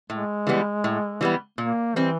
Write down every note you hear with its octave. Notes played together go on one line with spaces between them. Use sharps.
A2 G#3
E3 G3 B3
A2
E3 G3 B3
A#2 A#3
E3 G3 C4